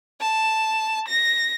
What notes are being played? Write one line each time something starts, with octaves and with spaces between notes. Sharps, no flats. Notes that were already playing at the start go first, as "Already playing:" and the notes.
A5
A#6